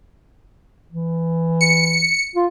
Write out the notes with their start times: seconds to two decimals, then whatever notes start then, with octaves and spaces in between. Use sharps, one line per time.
0.91 E3
1.61 C#7
2.35 F4